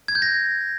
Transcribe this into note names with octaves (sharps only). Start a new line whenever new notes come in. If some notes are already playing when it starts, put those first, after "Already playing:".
G#6
G6
A#6